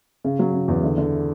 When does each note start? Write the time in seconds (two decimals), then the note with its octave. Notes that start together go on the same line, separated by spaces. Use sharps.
0.24 C#3
0.39 F#3
0.53 C#3
0.68 E2
0.84 D3
0.98 D3